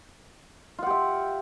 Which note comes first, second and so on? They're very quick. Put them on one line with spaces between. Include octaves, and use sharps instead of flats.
F4 F#5 G4 E5